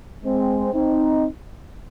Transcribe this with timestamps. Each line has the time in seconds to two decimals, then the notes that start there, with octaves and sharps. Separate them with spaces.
0.23 G#3 C4
0.73 C4 D#4